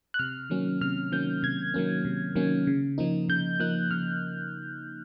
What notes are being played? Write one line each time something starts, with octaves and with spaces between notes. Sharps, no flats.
F#6
C3 F6
D#3 F#3 A#3 C#4
C3 F6
D#3 F#3 A#3 C#4 G6
C3 G#6
D#3 F#3 A#3 C#4
C3
D#3 F#3 A#3 C#4
C#3
F3 A#3 D#4
C#3 G6
F3 A#3 D#4 F#6
C#3 F6